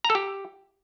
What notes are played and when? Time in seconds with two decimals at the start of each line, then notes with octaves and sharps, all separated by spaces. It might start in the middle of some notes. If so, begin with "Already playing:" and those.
0.04 A#5
0.10 A4
0.15 G4